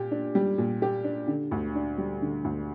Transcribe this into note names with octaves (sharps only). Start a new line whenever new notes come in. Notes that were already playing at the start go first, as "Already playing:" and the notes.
Already playing: A#2 G4
D4
G3
A#2
G4
D4
D3
D2
D4
G3
D3
D2